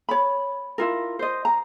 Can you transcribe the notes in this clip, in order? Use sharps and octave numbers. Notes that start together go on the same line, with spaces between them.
C#5 B5
E4 F4 A#4
C5 D#5
A#5